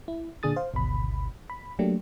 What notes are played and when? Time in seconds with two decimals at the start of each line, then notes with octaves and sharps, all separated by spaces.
0.08 E4
0.43 A#2 D3 D4 G#4 D#6 A6
0.56 C5 F5
0.74 G#1 D2 B2 B5
1.50 B5
1.79 F#3 A3 A#3 D4 G4